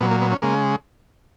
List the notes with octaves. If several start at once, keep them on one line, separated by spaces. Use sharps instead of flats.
A#2 F#3 B3
A#3
B3
C#4
C#3 G#3 A#3